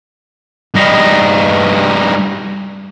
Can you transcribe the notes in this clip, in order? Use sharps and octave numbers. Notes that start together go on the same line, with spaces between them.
G2 D#4